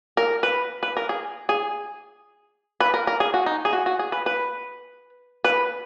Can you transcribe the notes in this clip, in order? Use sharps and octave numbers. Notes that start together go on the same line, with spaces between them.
A#4
B4
B4
A#4
G#4
G#4
B4
A#4
A#4
G#4
F#4
D#4
G#4
F#4
F#4
G#4
B4
B4
B4